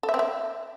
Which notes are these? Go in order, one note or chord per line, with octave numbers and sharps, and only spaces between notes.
A4
E5
C4
E5